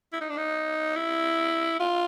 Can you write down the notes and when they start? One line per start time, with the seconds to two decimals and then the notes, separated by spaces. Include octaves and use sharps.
0.13 E4
0.21 D#4
0.30 D4
0.37 D#4
0.96 E4
1.80 F4